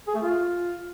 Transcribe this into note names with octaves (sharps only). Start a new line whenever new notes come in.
G#4
A3
F4